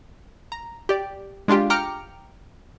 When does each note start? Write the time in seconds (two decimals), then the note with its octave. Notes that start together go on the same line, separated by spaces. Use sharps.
0.52 A#5
0.89 G4 D5
1.48 G#3 D4 F4 G4
1.70 G5 A#5 D6 F6 C#7